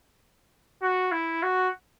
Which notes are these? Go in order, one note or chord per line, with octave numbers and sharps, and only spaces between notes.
F#4
E4
F#4